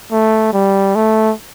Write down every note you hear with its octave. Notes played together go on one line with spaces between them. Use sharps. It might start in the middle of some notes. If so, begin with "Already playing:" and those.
A3
G3
A3